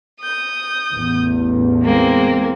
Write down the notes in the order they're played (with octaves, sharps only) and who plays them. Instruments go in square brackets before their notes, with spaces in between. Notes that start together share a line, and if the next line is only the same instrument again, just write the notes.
[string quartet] D#6 G6
[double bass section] A1 E2
[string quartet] G#3 A#3 C4